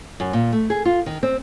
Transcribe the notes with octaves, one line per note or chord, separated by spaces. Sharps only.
F#2
A#2
A3
G#4
F4
D#3
C4